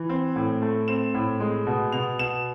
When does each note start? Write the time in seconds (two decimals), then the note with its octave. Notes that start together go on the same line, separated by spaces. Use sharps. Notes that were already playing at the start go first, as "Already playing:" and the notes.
Already playing: E3
0.09 C4
0.36 A2
0.62 A3
0.88 C4 E7
1.14 A2
1.40 G#3
1.67 B2
1.92 B2 F7
2.19 B2 E7